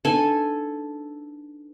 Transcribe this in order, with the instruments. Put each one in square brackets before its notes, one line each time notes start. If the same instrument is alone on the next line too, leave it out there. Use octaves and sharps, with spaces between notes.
[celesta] D4 D#4 B4 [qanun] A4 G#5